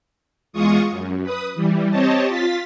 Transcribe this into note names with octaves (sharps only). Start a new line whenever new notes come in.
E2 G#3 F4 C#6 D#6
F#2
B4 D#6
E3 G3
C4 G4 C#5 D#5 A5
F4 A6 B6